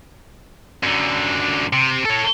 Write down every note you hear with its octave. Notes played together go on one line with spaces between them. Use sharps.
F#2 D3
C3
A4 C#5